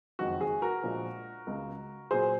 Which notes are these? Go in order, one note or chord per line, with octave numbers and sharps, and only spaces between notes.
F#1 F2 D#3 G#3 F#4
G#4
F#4 A#4
A#1 A#2 F3 G#3
C#2 C#3 G#3
A#2 F#3 G#4 C5